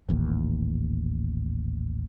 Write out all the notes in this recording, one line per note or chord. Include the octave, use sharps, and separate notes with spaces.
D#1 A1 D#2